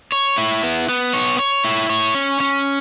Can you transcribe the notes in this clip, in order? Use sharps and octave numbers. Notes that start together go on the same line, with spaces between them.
C#5
E4
B3
B3
C#5
C#5
E4
C#5
C#4
C#4